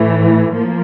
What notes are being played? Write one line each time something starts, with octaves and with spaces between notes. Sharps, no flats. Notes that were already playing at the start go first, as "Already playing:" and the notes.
Already playing: A2 E3 A3
F3 A#3